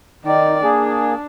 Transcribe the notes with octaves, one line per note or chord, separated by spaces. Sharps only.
D#3 D#4 D5
A#3 D4 G#4